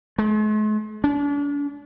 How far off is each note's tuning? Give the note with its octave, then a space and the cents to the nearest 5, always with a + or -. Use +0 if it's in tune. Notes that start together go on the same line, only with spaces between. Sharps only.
G#3 +45
D4 -40